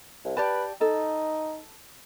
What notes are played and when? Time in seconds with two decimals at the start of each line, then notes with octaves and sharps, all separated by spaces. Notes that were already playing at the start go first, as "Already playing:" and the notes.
0.25 C2
0.37 G4 B4 D5 A5
0.81 D#4 A4